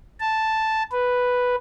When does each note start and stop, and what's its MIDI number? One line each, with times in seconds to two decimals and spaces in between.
0.20 0.82 81
0.92 1.55 71